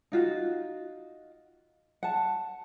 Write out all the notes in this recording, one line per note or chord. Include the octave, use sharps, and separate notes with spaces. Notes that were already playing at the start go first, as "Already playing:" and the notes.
D#4 F4 F#4
F#5 A5